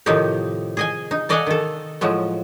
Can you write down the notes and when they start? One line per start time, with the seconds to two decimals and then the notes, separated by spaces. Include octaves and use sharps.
0.06 A2 C3 D#3 F3 D#4 G4
0.77 G#4 D#5 G#5
1.11 D#4
1.29 A4 D5 D#5 F5 F#5 G#5
1.47 D#3 A4
2.01 A2 F3 F#3 G#3